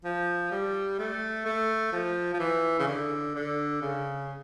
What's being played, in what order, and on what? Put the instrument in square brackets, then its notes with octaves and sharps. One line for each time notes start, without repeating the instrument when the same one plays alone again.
[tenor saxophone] F3
G3
A3
A3
F3
F3
E3
C#3
D3
D3
C#3